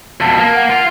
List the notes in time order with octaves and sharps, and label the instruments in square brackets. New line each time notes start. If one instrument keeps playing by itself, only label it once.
[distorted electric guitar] F2 B2 [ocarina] A5
[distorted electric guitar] A#3
[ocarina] F#5
[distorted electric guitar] F4